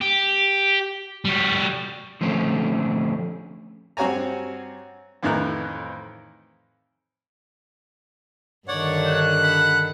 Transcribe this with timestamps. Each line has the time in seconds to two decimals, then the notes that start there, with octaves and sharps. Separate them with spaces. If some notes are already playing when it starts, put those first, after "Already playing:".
0.01 G4
1.25 G3 F#4
2.21 D3 F3 A3 C4 C#4
3.97 G2 C4 F#4 C#5 G#5 A#5
5.23 F2 A2 D#3 E3 A#5 F#6
8.68 G2 D3 D#3 C#5 D5 F#5
9.07 F#6
9.43 F#5 B5